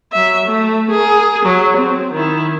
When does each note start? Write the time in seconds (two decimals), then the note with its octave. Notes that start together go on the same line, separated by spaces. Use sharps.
0.13 F#3 E5
0.46 A3
0.91 G#4 A#4
1.46 F#3
1.77 C4
2.13 D#3 E4